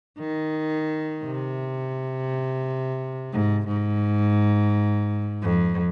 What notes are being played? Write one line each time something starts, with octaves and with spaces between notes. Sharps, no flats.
D#3
C3
G#2
G#2
F2